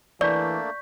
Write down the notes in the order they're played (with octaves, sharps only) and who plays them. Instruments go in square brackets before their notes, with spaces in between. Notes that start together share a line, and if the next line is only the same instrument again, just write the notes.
[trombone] E3 [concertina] A3 A#3 D4 [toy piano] D5 [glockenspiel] C#6 G6 B6